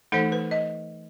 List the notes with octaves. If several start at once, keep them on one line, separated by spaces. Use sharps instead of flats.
E3 A3 D#4 A4
B4
D#5